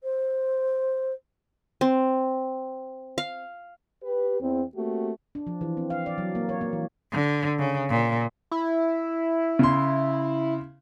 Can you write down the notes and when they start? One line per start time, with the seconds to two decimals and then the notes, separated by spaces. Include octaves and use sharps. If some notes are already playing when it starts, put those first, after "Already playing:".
0.03 C5
1.81 C4
3.18 F5
4.04 G4 B4
4.41 E2 C4
4.76 A3 A#3 C4 F#4 G4
5.35 D4
5.47 F3
5.61 E3
5.77 C4
5.90 F5
6.06 D5
6.18 F#3
6.35 A#3
6.49 C#5
6.61 A#3
6.73 E3
7.13 D3
7.59 C#3
7.90 A#2
8.51 E4
9.59 C#3 C6